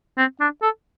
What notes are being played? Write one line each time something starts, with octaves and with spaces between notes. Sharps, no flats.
C4
D4
A4